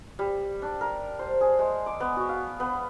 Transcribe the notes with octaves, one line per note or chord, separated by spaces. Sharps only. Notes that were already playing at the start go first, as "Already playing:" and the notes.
G3
D4
A#4
C5
G#4
G#3
D6
B3
F#4
F5
B3